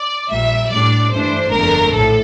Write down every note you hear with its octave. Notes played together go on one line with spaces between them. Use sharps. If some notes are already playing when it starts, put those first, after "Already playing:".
Already playing: D5
A#1 A#2 G3 E5
A2 G3 D4 D5
G2 E3 A3 D4 C5
G1 F2 D3 A3 A#4
A#1 A2 A4